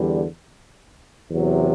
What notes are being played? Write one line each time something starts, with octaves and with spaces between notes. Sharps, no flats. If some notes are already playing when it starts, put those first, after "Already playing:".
Already playing: E2 D3 G3
E2 C3 F#3